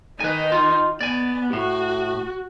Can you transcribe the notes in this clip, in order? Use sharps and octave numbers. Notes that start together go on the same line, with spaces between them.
D#3 D#4 B4 G#5
F4
B3 D5 G#5
A2 F#4